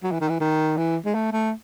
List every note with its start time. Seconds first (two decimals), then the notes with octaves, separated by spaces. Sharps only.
0.03 F#3
0.12 E3
0.21 D#3
0.29 E3
0.40 D#3
0.77 E3
1.05 G#3
1.15 A3
1.32 A3